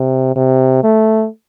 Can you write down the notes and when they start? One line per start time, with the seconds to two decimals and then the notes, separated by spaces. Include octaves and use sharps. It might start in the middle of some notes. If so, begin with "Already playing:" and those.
Already playing: C3
0.36 C3
0.84 A3